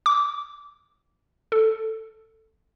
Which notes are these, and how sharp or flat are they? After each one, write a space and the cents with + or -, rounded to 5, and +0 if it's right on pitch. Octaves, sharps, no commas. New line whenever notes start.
D6 -15
A4 +5